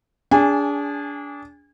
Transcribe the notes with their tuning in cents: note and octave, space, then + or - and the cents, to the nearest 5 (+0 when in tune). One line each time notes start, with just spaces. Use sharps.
D4 -30 G#4 -15 G#5 -35